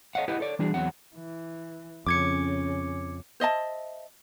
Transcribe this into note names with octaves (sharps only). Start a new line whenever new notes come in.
A4 C#5 D#5 F5 F#5
E4 G4 B4 D#5 F#5
A4 C#5 D5
E3 G3 D4 F#4 G#4
E2 F#3 C4 F#5
E3
F2 C#3 C#4 D6 G#6 C#7
C5 D#5 E5 A5